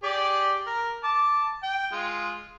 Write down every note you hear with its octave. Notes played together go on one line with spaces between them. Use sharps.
G4 G#4 D5
A#4
A5 D6
G5
G#3 F4